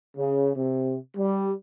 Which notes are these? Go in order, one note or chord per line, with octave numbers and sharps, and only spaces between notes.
C#3
C3
G3